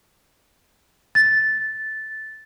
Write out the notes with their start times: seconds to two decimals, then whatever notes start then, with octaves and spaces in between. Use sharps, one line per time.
1.15 A6